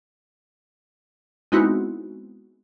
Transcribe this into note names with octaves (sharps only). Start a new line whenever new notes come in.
G#3 B3 C4 D#4 E4 F#4